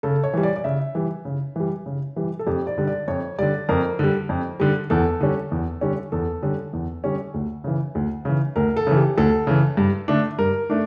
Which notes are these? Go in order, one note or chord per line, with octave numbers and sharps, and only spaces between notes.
C#3 A4
C#5
E3 G3
D5
D5
C#3 E5
E3 G3
C#3
E3 G3
C#3
E3 G3
A4
F2 G4
D5
D3 G3
D5
F2 C#5
D3 G3 D5
F2 A#4
D3 G3
F2
D3 G3
E2 A4
D3 G3 C#4
E2
D3 G3 C#4
E2 A4
D3 G3 C#4
E2
D3 G3 C#4
D2
C#3 E3
D2
C#3 E3
D2 A#4
A4
C#3 E3
G4
D2 A4
C#3 E3
G2
D3 A3 D4
G2 A#4
A3 D4